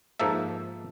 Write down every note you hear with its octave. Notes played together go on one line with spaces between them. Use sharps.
G#2 F3 A#3 A4 E5